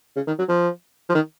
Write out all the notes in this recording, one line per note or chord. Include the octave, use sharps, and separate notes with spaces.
C#3
D#3
F#3
F3
F3
D#3